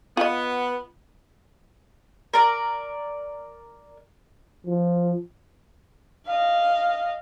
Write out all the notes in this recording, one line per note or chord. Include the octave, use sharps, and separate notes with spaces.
B3 F4 D#5
A#4 D5
F3
D#5 F5